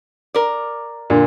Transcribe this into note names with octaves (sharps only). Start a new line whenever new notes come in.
A#4 D5
A#2 D3